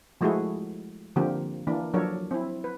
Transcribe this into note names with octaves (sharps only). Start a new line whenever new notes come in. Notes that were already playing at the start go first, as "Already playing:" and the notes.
F3 G#3 A3 E4 F#4 G#4
D3 F3 A#3 C4 G4
E3 A#3 D4
F3 F#3 D4 A4 A#4 C#5
C4 E4
B4